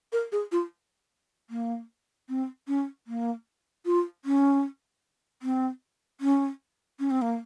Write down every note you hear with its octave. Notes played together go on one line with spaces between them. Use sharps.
A#4
G#4
F4
A#3
C4
C#4
A#3
F4
C#4
C4
C#4
C#4
C4
A#3